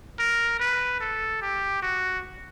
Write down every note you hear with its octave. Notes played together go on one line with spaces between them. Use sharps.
A#4
B4
A4
G4
F#4